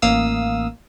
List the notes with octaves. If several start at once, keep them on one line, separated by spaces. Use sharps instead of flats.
A1 A#3 F5 D#6 E6